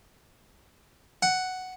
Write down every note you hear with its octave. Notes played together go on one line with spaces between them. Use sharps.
F#5